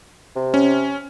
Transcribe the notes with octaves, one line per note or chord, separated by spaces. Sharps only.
C3
C#4